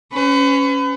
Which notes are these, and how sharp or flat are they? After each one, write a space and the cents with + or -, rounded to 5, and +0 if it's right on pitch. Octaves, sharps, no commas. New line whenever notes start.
C#4 +0 B4 +40